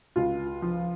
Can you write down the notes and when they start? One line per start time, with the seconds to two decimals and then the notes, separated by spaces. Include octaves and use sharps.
0.16 C#2 F4
0.62 F3